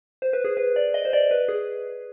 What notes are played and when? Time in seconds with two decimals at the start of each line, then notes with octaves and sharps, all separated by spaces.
0.22 C5
0.33 B4
0.44 G#4
0.57 B4
0.76 D5
0.94 D#5
1.05 C5
1.13 D5
1.31 B4
1.48 G#4